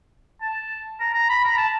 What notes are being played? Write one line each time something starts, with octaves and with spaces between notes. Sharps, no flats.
A5
A#5
A#5
B5
A#5
A5